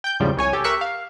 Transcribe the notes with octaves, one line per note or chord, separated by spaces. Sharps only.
G5 G6
E2 G#2 C#3 F3 G3
C2 C#5 G#5
G4 A4
G4 A#4 E5 C#6 F#6
F5